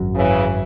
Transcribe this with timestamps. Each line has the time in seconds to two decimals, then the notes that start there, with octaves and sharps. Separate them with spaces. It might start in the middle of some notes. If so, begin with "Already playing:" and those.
Already playing: G#1 F#2 F#3
0.15 C#3 E3